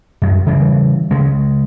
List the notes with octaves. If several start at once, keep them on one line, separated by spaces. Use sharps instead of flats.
F#2
C#3 E3 G3
C#3 G#3